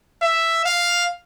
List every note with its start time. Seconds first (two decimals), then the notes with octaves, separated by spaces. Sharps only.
0.22 E5
0.65 F5